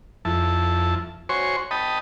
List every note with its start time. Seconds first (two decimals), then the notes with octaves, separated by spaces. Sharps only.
0.25 F2 E4 A5
1.29 F#4 C5 C#5 G#5 C6 C#6
1.71 D#5 G5 A5 B5 D#6